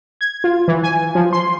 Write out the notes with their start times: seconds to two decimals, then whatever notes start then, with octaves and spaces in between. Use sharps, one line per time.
0.21 G#6
0.44 F4
0.68 E3
0.83 G#5
1.15 F3
1.33 C6